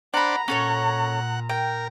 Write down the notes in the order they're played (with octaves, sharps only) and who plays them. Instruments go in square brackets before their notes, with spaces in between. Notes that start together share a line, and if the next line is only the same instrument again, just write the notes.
[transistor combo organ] D4 C5 D5 [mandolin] F#5 B5 [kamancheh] A#5
[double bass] A#2 [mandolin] C#4 A4 C#5 [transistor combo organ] F#5
[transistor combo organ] A#4 [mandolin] G5